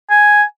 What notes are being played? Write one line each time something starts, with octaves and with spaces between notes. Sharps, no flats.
G#5